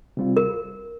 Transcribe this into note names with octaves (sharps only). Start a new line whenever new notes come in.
C3 G3 C4 F4
A#4